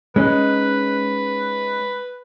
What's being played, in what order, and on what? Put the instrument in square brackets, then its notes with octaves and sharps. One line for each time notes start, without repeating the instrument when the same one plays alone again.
[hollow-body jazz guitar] G#3 C#4 D#4 [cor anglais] B4